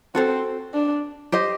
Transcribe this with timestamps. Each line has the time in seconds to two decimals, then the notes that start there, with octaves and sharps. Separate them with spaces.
0.15 C4 F#4 A4 C5
0.74 D4
1.32 G4 C5 D#5